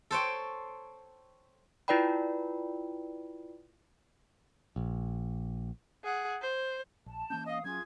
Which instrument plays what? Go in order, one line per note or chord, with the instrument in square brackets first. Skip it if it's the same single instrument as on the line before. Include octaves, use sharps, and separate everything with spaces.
[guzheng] A4 C5 C#5 G5
[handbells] E4 F4 B4 D5 G5 B5
[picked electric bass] A#1
[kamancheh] G#4 F#5
C5
[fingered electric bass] A#1 [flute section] A5
[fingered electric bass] E3 A#3 C#4 [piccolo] G6
[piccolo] D#5 [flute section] F5 D#6
[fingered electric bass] F#3 C#4 [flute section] F4 G#4 [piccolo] G#6